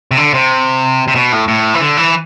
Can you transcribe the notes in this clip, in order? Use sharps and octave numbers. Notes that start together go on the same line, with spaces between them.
C3
D3
C3
C3
B2
A2
A2
E3
D3
E3